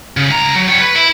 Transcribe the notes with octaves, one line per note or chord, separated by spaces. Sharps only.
C#3
C#2 A#5
F#3
G3 C#5
B4
E4